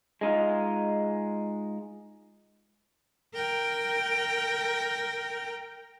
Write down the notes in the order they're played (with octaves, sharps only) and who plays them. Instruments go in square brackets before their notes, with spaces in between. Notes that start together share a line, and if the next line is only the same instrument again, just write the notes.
[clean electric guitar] G#3 D#4 F4
[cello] A#4 G5